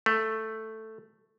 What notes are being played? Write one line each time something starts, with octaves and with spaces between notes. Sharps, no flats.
A3